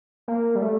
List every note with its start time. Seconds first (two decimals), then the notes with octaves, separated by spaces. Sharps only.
0.28 A#3
0.55 G3
0.62 A3